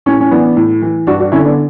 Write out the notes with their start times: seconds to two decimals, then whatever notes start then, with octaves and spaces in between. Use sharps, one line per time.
0.06 A2 C#4
0.21 C#4
0.31 E3 B3 D4
0.57 A2
0.82 E3
1.07 G2 D4 F#4
1.20 D4 F#4
1.32 D3 C#4 E4
1.45 B3 D4